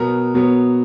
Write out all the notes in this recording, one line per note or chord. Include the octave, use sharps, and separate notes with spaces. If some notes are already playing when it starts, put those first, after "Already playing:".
Already playing: B2 F#3 B3 A#4
B2 F#3 B3